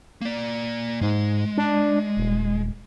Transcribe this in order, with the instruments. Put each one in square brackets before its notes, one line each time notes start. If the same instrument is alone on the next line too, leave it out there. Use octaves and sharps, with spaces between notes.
[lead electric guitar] A#3 D5
[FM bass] G#2 [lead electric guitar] G#3
[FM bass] D4
D#1